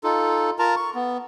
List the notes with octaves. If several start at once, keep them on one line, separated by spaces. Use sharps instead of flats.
D#4 F4 A4
F4 A#4 A5 A#5
C#6
B3